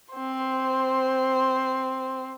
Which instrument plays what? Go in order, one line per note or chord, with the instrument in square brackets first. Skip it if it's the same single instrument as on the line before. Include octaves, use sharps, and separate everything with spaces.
[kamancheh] C4 C5